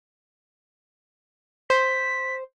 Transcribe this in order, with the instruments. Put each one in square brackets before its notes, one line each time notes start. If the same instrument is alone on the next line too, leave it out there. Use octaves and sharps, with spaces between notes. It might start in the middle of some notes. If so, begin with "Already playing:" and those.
[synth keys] C5 [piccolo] B6